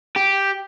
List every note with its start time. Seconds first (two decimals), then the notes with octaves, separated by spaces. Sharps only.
0.16 G4